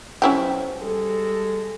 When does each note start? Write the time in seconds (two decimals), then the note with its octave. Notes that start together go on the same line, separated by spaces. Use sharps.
0.22 B1 C#4 E4 G4 C5
0.82 G3 G#3 A4